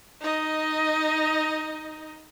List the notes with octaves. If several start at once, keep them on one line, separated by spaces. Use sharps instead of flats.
D#4 D#5